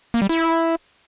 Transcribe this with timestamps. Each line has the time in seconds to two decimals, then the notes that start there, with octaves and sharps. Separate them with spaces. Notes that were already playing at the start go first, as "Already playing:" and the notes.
0.14 A#3
0.22 G3
0.29 E4